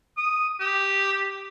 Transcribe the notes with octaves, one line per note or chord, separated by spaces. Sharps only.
D#6
G4